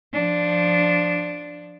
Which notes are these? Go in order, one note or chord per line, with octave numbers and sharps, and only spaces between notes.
F3 D4